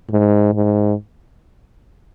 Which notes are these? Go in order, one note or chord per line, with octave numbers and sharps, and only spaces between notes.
G#2
G#2